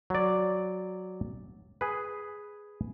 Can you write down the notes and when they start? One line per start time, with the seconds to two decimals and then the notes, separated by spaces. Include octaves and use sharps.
0.10 F#3 D5
1.81 G#4 B4